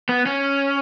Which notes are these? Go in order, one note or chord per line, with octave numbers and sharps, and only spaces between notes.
B3
C#4